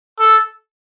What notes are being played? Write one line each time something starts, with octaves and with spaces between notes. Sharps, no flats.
A4